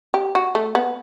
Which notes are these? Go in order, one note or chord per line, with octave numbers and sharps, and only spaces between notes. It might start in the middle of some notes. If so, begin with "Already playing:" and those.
G4
F#4
A3
B3